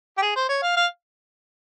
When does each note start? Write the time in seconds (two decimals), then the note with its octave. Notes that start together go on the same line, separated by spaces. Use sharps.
0.18 G4
0.22 G#4
0.36 C5
0.49 C#5
0.63 F5
0.77 F5